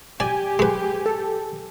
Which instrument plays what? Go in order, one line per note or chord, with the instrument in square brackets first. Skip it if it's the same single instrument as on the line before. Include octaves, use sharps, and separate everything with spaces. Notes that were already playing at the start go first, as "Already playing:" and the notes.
[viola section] G4 [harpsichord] D5 [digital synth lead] G#5
[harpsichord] G#3 B4
[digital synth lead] A4